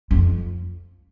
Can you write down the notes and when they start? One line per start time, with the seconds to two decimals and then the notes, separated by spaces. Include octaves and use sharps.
0.11 F2